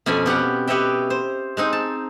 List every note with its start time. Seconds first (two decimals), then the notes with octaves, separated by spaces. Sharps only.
0.06 F2 B2 C#4 D5 G#5
0.26 B3 G4 F5 F#5
0.67 G4 B4 C#5 D#5 E5 G5
1.10 C5
1.57 G#3 C4 D#4
1.73 A5